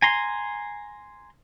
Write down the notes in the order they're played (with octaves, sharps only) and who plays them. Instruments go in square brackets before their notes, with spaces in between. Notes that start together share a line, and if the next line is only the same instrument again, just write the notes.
[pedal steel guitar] G#5 A#5 C6